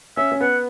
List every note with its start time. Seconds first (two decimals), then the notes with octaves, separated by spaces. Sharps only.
0.17 C#4 E5
0.32 C#4
0.41 B3 F#5